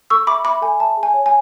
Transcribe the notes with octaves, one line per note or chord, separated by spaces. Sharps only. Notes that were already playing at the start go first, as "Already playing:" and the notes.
A4 C#6 E6
E5 B5 D6
E5 B5 D6
A4 G#5
E5 A5
G#4
G#5
C#5
G#5